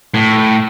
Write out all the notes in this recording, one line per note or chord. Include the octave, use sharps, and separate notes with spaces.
A2